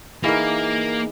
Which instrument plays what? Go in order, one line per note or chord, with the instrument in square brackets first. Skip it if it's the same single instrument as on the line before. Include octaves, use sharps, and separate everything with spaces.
[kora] E3 A#4 [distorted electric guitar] A#3 [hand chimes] D#4 G#4 D#5